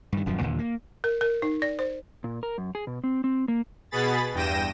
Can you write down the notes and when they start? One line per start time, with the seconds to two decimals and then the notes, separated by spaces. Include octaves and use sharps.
0.12 G2 D#3
0.26 D#1 F#2 F3
0.41 D#2 A#2 D3
0.59 A#3
1.04 A#4
1.21 A#4
1.42 D#4
1.62 D5
1.79 C5
2.24 A#2
2.43 A#4
2.58 F#2
2.75 G#4
2.87 B2
3.04 C4
3.24 C4
3.48 A#3
3.91 B2 B3 G#4 B5 A6
4.34 E2 G2 G5 A#6 D#7 E7